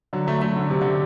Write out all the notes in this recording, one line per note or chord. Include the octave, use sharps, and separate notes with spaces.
D3 F#3
F#3 A3
F#3 A3
D3
C3
D3